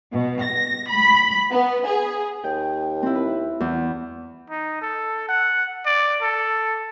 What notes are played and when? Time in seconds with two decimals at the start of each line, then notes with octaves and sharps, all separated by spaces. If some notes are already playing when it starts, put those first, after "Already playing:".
0.13 B2
0.43 A#6
0.91 B5
1.51 B3
1.86 G#4
2.44 D#2 G5
3.03 C4 E4
3.15 B4
3.60 E2
4.50 D#4
4.81 A4
5.29 F#5
5.86 D5
6.22 A4